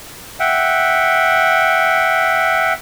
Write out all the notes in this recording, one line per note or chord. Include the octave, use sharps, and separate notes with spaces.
E5 F#5 G5